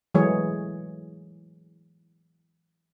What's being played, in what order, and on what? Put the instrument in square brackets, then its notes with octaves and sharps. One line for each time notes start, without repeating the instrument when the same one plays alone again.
[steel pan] E3 F#3 G#3 A3 G#4 C#5